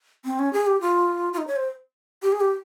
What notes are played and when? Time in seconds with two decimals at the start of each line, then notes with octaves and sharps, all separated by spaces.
0.25 C4
0.39 C#4
0.53 G#4
0.67 G4
0.81 F4
1.33 F4
1.38 D#4
1.47 C#5
1.56 C5
2.22 G4
2.32 G#4
2.41 G4